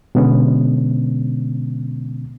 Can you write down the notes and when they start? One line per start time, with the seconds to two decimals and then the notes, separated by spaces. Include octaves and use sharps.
0.15 B2 D3 G#3 B3 C#4